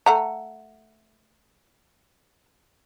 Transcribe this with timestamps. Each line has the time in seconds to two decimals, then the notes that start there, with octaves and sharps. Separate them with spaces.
0.06 A3 F#5 A#5